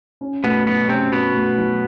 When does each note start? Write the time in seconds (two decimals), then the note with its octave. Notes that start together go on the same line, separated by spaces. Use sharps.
0.21 C#4
0.43 B2 A3 B3
0.67 B2 F#3 B3
0.89 C3 C4 C#4
1.12 B2 B3 C#4
1.35 A3
1.57 F#3